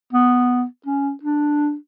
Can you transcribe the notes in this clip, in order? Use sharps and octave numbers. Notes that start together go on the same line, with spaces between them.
B3
C#4
D4